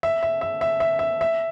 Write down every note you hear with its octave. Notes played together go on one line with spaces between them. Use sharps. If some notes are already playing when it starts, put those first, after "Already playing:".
E5
E5
E5
E5
E5
E5
E5